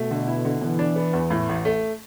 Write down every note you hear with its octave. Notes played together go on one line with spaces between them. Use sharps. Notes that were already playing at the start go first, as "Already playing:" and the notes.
Already playing: B2 A3
D3
E4
D3
B2 E3
D4
B3
E2
A2
A1
A3